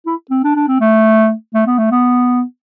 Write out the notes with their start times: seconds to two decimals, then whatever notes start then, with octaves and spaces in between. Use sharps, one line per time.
0.06 E4
0.30 C4
0.44 D4
0.55 D4
0.68 C4
0.81 A3
1.54 A3
1.66 B3
1.78 A3
1.91 B3